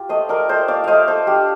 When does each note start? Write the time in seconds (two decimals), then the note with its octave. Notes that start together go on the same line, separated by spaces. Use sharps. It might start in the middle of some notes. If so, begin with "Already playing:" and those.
Already playing: F4 G4
0.09 A3 C5 D#5
0.29 A#4 D5
0.49 A3 C5 D#5
0.68 D5 F5
0.84 A3 C5 D#5 F5
1.08 A4 C5
1.27 D4 G4